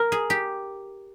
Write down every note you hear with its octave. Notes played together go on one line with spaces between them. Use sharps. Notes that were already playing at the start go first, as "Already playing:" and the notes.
Already playing: A#4
G#4
G4